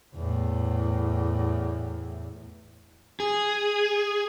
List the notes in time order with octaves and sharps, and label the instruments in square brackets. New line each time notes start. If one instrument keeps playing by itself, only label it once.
[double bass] E2 A2
[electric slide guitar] G#4